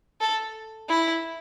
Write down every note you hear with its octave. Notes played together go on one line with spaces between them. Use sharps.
A4
E4